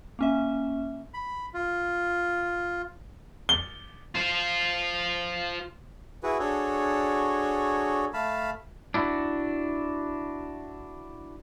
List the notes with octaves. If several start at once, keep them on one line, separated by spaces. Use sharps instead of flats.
A#3 C#4 E5
B5
F4
G7
F4 C5
E4 F#4 G#4 B4
D4 F#4 G#4 A4 C#5
A3 F5 A5 B5
D4 E4 F#4